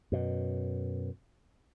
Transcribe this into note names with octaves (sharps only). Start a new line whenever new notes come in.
F#2 B2